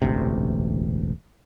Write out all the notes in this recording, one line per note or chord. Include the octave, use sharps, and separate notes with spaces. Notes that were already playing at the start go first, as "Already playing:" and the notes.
E1 A1 D2 C3